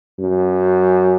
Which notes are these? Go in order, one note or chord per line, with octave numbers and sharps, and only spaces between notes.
F#2